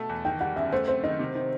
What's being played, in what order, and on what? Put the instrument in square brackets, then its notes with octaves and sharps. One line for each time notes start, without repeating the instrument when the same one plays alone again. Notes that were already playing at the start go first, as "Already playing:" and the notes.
Already playing: [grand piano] B2 A3 [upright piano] A5
[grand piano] E2
[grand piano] D#3 [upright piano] G5
[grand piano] G3 [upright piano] F#5
[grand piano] F#2 [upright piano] E5
[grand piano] A3 [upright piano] C5
[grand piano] C4 [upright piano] C5
[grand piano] D#3 [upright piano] D#5
[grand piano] C3
D#3